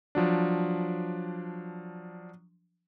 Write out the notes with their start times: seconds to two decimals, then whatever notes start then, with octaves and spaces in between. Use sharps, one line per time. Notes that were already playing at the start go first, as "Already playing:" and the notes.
0.15 F3 F#3 D4